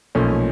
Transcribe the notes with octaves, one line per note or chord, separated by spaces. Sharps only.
B1 A#2 F3 A3 C#4